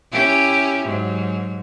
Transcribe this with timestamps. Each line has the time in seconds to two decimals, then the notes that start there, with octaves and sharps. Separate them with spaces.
0.12 C#4 E4 G4
0.86 G#2 F#3